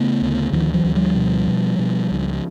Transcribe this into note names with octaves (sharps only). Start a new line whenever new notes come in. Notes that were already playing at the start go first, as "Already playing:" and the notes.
Already playing: C#3 A3 B3
D2
D2 D#3 F3
E3 F#3
D2
F3 G3
B2
B2
B2
C#2